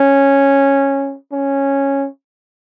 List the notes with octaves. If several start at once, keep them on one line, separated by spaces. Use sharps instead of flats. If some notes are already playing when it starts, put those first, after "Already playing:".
Already playing: C#4
C#4